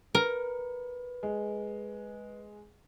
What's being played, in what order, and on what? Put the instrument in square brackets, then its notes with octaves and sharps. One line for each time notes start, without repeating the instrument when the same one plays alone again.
[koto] A#4 [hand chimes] B4
[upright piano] G#3